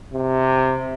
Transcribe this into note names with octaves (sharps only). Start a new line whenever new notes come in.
C3